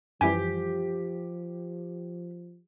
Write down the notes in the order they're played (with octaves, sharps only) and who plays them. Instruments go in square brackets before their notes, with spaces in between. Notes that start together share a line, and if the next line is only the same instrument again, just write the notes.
[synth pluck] F#2 E3 G3 [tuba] F3 [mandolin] G4 [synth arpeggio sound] G#5